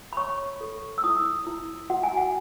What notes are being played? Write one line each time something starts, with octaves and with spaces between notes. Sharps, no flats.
B5
C#5 C#6
A4
E6
E4 D#6
E4
F#4 F#5
G#5
F#5